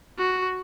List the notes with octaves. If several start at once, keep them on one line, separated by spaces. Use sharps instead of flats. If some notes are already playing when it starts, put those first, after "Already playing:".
F#4